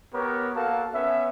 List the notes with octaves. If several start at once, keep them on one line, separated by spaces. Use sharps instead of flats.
B3 G4 A#4 C#5
A#3 F#4 A4 F5 A5
B3 C#4 E5